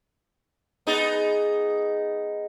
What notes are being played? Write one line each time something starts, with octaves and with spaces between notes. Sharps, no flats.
B3 D#4 G#4